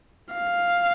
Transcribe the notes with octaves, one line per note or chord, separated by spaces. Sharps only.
F5